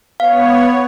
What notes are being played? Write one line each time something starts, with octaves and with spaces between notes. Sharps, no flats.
B3 C#5 F5